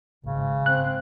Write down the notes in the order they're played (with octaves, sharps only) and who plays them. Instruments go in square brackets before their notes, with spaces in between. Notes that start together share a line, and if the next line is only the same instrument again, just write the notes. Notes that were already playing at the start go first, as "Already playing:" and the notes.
[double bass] G#1 G#2 [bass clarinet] C#3
[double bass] C4 [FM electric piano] F#6